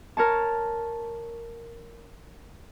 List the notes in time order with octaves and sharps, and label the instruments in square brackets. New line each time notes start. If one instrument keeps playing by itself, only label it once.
[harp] A#4 C#5 A5